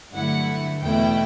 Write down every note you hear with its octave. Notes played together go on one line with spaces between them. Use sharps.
G2 D3 F#3 A3 E4 F#5
E2 B2 A3 E4 G5